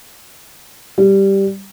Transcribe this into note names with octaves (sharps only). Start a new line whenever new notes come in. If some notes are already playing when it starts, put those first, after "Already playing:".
G3